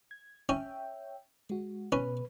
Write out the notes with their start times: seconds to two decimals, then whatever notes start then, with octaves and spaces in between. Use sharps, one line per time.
0.11 G#6
0.49 C#4 C#5 E5 G5
1.50 G#3 F#4
1.92 B2 C#4 B4